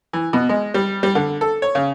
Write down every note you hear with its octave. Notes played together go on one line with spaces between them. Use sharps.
E3
B2
G#3
G3
G3
D3
A4
C#5
C#3